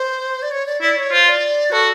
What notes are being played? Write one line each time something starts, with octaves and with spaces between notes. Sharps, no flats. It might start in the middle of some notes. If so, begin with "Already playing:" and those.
Already playing: C5
D5
C#5
D5
E4 D5
C#5
F4 C5
D5
F#4 A4